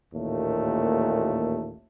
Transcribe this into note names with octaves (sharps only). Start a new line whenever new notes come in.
A1 D#2 A#2 A3